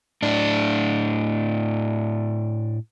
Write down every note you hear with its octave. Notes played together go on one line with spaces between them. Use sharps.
A2 D4